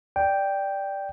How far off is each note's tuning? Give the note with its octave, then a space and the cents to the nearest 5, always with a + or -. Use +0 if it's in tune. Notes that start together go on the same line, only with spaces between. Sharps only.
D5 +0 G5 +0